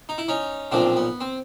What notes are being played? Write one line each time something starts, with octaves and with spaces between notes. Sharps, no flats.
D#4
E4
C#4 D#4
B1 A#2 F3 C4 D4
B3
C4